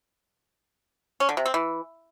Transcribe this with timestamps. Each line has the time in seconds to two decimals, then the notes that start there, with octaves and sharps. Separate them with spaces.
1.20 C#4
1.29 D3
1.37 C3
1.46 C4
1.54 E3